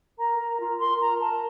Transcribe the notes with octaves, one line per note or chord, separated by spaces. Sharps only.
A#4 A#5
A#4
F4
A#4 C6
A#4 A#5
A#4 A5